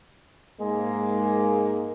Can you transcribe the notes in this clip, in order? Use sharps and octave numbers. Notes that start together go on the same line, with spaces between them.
G#2 G#3 A#3